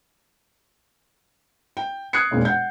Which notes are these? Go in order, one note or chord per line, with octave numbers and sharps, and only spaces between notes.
G5
D#6 F#6 G#6 C7 C#7
E1 A#2 G#3
F#5 G6